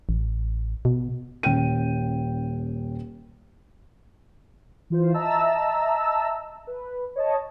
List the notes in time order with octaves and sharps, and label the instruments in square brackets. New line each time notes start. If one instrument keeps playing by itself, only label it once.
[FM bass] A1
B2
[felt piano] D#1 C#4 G5 D#7
[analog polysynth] E3 F4 C5
D#5 E5 A5 A#5 E6
B4
C#5 D#5 A5